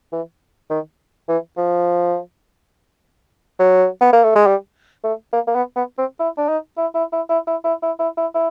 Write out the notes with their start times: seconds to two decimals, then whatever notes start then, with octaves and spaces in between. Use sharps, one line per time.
0.12 E3
0.70 D#3
1.28 E3
1.57 F3
3.59 F#3
4.01 B3
4.13 A#3
4.24 A3
4.35 G#3
4.47 G3
5.04 A3
5.33 A#3
5.47 A#3
5.55 B3
5.76 B3
5.98 C4
6.20 E4
6.37 D4
6.49 D#4
6.77 E4
6.95 E4
7.12 E4
7.29 E4
7.47 E4
7.64 E4
7.82 E4
7.99 E4
8.17 E4
8.34 E4